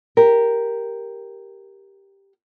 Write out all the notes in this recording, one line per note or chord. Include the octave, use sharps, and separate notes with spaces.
G4 A#4